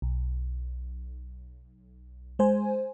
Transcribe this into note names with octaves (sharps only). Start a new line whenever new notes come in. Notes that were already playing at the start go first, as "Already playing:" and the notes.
B1
G#3 C5 G#5